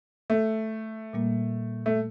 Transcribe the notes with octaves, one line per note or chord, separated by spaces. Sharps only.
A3
A#2 G3 A#3
A3